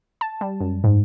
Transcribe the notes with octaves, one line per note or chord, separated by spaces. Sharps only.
A5
G3
F#2
G#2